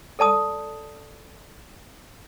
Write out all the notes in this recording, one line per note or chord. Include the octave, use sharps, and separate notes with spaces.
A4 D5 A5 D#6